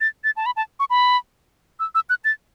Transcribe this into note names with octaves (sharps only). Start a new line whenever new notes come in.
A6
A6
A5
B5
A5
C#6
B5
E6
E6
F#6
A6